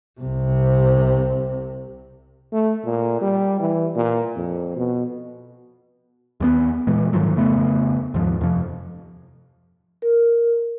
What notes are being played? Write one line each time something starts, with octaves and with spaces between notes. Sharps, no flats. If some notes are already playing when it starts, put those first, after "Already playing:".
C2 C3
A3
A#2
G3
E3
A#2
F2
B2
D#2 G3 B3
A#2 E3 G#3
G#2 D#3 F3 F#3
F2 C#3 A3 B3
D#2 G#2 F3
F2 C3 F3
A#4